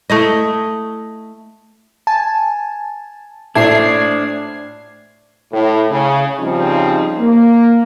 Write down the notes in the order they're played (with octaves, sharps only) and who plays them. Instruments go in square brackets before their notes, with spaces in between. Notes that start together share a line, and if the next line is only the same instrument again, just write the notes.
[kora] A3 E4 D#5
[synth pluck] G#5 A5
[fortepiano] A2 A3 [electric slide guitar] D4 C5 D5 [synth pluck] G#6 C7
[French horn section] A2
C#3
C#3 F3 G3 C4 D#4
A#3